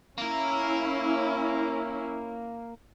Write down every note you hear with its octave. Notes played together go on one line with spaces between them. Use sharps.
A#3 C#4 E4 A#4